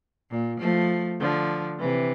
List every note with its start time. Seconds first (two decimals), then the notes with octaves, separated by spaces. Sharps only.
0.31 A#2
0.60 F3 A3
1.21 D3 F3
1.81 C3 E3